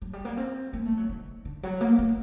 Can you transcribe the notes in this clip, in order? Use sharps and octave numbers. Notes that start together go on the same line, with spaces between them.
F#3
G3
A#3
C4
A#3
A3
F#3
D#3
D3
F#3
A#3
A#3